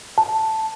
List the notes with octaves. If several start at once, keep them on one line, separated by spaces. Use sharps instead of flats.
A5